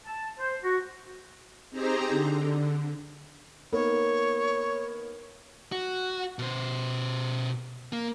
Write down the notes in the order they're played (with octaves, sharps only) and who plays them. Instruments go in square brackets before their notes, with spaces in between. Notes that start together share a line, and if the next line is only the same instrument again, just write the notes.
[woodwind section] A5
C5
F#4
[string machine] C4 D#4 G4 G#4 C5 A#5
D3
[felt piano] A#3 B3 D#4 [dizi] C#5
[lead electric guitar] F#4
B2 C5
A#3